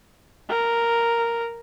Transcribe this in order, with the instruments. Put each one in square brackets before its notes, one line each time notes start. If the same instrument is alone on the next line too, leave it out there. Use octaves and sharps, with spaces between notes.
[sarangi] A#4